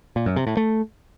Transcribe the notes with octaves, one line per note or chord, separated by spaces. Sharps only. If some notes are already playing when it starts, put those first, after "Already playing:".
A#2
F#2
C3
A2
A3